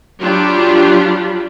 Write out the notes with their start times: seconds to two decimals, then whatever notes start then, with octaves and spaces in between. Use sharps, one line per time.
0.19 F#3 D4 F4 G4 B5